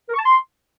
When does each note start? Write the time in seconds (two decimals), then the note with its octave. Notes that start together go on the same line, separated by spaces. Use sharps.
0.08 A#4
0.13 C#6
0.19 A5
0.24 C6